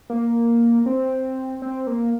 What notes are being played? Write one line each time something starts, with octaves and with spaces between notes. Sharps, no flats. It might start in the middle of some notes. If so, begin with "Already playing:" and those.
A#3
C4
C4
A#3